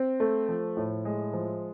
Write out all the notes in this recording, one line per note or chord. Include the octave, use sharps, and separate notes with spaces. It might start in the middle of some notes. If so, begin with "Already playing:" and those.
Already playing: C4
A3
F3
A2
G#3
F3